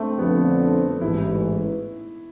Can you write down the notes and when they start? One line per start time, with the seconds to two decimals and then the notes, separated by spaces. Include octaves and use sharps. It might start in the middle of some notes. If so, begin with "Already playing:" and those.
Already playing: A3 C4 D4
0.19 F2 D3 F3 B3
1.01 A1 G#2 E3 E4